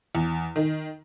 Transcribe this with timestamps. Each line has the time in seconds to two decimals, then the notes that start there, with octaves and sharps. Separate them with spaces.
0.15 E2
0.56 D#3